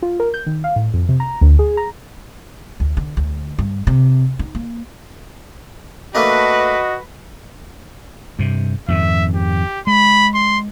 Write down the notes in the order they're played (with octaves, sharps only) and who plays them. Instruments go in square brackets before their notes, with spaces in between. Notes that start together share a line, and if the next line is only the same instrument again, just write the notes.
[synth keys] F4
A#4
G6
D#3
F5
A2
F2
C3
A#5
D2
G#4
A#5
[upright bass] D2
D3
D2
G2
C3
D#4
A#3
[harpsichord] A3 A#3 D4 [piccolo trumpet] F#4 [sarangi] B4 [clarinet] D#5
[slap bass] G2 C3
[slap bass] F2 G#2 D#3 [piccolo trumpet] E5
[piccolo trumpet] G4
[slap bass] G#3 [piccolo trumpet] B5
[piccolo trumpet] C6